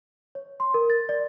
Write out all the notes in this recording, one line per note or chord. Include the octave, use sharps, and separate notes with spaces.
C#5
C6
A#4
A6
D5